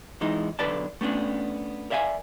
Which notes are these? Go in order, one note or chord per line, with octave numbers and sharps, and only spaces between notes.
E3 G#3 D#4
B1 D3 B4 D5 A5
A3 B3 C#4 D4
A#4 D5 E5 F5 G5 G#5